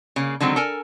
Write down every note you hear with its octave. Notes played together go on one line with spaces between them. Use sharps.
C#3 A#3
D3 D#3 F#3 G#3 C4
A4 A#4 G#5